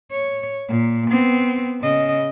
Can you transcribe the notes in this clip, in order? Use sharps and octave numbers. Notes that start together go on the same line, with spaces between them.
C#5
A#2
B3 C4
C#3 D#5